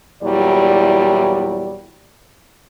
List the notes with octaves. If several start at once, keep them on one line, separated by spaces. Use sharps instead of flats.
E2 A#2 F#3 G3 E4 D5